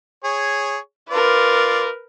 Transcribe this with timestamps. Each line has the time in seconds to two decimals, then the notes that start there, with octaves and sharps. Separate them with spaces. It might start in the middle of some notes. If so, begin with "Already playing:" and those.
0.24 G#4 C#5
1.10 F4 A#4 B4 D5